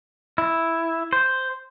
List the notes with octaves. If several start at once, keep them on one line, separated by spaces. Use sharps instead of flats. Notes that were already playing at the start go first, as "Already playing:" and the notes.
E4
C5